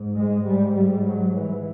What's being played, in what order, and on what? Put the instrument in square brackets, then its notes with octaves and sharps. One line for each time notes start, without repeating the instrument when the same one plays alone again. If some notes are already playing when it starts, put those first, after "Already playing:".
Already playing: [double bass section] G#2
G#3
G3
G3
F#3
E3